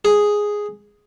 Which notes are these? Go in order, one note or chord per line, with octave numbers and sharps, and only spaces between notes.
G#4